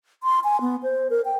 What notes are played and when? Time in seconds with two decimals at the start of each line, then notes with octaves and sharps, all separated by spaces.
0.23 C6
0.44 G#5
0.61 B3
0.83 C5
1.10 A#4
1.25 G5